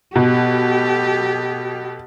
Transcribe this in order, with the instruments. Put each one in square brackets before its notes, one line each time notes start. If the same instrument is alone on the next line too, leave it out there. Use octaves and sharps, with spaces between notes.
[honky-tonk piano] B2 [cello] G4 A4